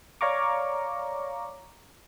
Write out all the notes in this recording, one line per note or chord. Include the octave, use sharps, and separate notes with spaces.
C#5 D5 F5 A#5 C#6 D6